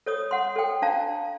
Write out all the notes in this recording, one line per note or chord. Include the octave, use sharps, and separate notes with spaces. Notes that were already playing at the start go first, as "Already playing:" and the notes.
A4 C#5 D#6
F#5 C6
A4 G5
D4 F5 A5 A#5